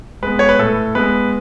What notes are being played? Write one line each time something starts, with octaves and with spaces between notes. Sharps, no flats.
G#3 B3 B4
C#5
B4
A2 A4
G#3 B3 B4